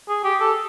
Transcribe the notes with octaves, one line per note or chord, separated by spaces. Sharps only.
G#4
G4
A4